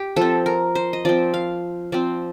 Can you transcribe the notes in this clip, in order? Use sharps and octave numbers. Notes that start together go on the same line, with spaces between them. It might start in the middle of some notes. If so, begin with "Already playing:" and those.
Already playing: G4
F3 C4 A4
A#4
C5
D#5
F3 C4 D5
F5
F3 C4 D5